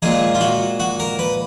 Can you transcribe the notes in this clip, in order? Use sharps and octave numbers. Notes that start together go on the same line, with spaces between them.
A#2 G#3 D#4 G#4
F4
F#4
F#4
A#4
B4